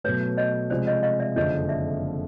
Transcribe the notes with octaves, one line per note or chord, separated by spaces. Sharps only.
B2 F#3 A3 B4 C#5
C#5 D#5
C3 F3 G#3 C5 D5
C#5 D#5
D#5 F5
D5 E5
F#1 F2 D3 F3 C#5 D#5
D5 E5